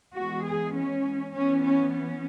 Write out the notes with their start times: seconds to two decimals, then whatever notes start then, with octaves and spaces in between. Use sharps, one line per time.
0.15 E3 G#3 B3 F#4
0.45 G#4
0.75 C#4
1.34 E3 B3 C#4
1.63 C#4
1.93 C#4